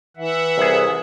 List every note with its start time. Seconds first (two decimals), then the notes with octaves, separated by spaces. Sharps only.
0.17 E3 E5 F#5
0.58 C2 G#4